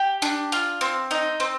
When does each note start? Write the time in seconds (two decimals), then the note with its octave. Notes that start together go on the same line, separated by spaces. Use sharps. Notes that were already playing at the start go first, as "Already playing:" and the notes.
Already playing: G4
0.22 D4
0.52 F4
0.81 C4
1.11 D#4
1.40 C4